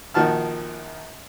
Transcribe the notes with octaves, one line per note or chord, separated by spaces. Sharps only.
A#1 D#3 F3 F#4 A5 F6